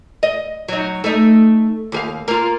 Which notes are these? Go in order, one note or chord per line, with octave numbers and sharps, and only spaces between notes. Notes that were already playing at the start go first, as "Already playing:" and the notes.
D#5
F#3 D#4
A3 D#4
D#2 G#4 F5
A#3 F4